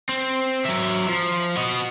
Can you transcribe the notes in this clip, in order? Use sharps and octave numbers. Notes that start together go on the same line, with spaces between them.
C4
F#3 E5
F3
F#4 D#5